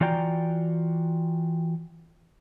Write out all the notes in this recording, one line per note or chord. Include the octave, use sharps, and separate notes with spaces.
E3 F4 F#4 D5 G5 A#5